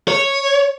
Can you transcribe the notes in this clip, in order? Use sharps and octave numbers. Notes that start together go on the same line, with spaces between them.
C#5